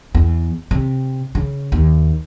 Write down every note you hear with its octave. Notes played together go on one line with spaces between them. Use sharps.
E2
C3
C#3
D#2